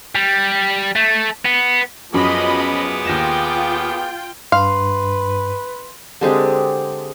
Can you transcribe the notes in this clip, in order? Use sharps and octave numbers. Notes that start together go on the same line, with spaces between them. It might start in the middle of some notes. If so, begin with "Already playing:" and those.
G3
A3
B3
F#2 F3 B3 G#4 D#5 B5 D6
D#2 F4 G5 A#6 E7
G2 B4 F5 C6
D3 G#3 C4 G4